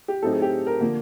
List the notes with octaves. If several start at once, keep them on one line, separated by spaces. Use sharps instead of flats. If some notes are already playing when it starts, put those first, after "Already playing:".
G4
A2 F#3 A3 C4 D#4 A4
G#4
G4
A#4
D3 F3 A#3